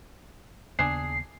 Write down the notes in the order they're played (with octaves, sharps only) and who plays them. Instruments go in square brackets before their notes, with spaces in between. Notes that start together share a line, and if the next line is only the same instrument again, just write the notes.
[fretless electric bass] D#2 C#3 B3 [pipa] D4 G#4 [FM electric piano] C7